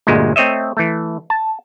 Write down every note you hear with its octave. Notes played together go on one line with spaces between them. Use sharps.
G1 D2 A#2 G#3
A3 C4 C#5 D#5 E5
E3 A3
A5